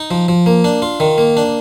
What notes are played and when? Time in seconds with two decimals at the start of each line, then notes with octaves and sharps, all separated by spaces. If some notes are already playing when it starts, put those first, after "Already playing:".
Already playing: D#4
0.11 F3
0.28 F3
0.46 A#3
0.64 D4
0.82 F4
1.00 D#3
1.18 A#3
1.37 D4